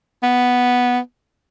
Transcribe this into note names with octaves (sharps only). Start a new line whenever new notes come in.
B3